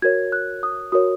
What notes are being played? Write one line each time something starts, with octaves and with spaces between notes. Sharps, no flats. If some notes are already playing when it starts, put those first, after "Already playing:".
F#4 A#4 C#5 G#6
F#6
D#6
F#4 A#4 C#5 D#6